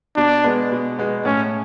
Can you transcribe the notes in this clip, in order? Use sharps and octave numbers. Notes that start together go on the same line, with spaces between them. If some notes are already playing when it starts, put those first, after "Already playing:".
B2 D4
G#3 B3
B2
G#3 B3
A2 C#4